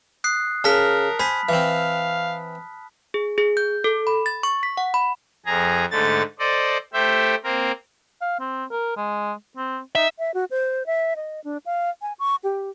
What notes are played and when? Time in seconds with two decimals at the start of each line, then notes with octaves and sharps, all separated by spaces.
0.24 D#6 F#6 C7
0.64 C#3 A#4 A5 F6 B6
1.19 C5 G#5 B5 B6
1.49 E3 C4 F5
3.14 G#4
3.38 G#4
3.57 G6
3.84 A4
4.07 B5
4.26 A6
4.43 C#6
4.63 B6
4.77 F#5
4.94 B5
5.46 F2 G#4 A#5
5.91 G#2 D3 A3 A6
6.39 A4 C5 D5 D#5
6.94 A3 G4 C5 E5 G5
7.44 A#3 C4 A#4
8.21 F5
8.40 C4
8.71 A#4
8.97 G#3
9.56 C4
9.95 D#4 E5
10.19 E5
10.34 F#4
10.51 C5
10.86 E5
11.16 D#5
11.44 D4
11.66 F5
12.02 G#5
12.19 C#6
12.44 G4